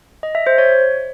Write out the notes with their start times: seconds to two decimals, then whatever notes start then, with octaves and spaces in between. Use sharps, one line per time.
0.23 D#5
0.35 E5
0.47 C5
0.58 C#5